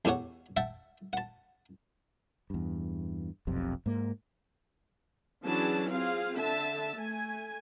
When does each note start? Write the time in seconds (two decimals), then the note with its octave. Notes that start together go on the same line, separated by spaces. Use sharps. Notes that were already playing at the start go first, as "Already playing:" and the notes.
0.05 E2 G4 A4 C#5 F#5
0.57 E5 F#5 G5 A5
1.13 F#5 A5
2.50 E2 G2
3.47 F1 B1 F2 C3
3.86 G#2 A#3
5.44 E3 F#3 C#4 D4 G#4 A5
5.91 C4 F4 G#4 F5
6.38 D3 E5 A5
6.97 A3 G#5